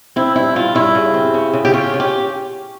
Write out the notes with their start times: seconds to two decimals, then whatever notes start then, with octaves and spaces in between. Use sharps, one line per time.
0.16 C4 E4
0.36 G2 E4
0.56 G2 F4
0.75 G2 E4
0.95 C#3
1.14 C4
1.34 C#3
1.53 C#3
1.65 G4
1.73 C#4 F4
1.94 C#4
2.00 G4